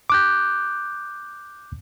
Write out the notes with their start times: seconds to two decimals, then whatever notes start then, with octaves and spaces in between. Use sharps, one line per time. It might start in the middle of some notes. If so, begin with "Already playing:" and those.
0.10 D6 F#6 G6